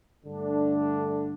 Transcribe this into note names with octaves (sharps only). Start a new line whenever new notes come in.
G2 D3 A3 D4